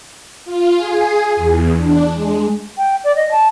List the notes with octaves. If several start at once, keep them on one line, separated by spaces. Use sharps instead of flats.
F4
G#4
E2
D4
G#3
G5
D5
D#5
A5